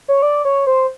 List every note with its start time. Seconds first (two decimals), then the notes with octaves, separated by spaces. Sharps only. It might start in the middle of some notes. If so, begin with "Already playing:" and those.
0.08 C#5
0.22 D5
0.45 C#5
0.67 C5